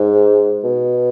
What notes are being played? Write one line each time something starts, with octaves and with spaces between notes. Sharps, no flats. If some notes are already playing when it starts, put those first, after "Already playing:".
Already playing: G#2
B2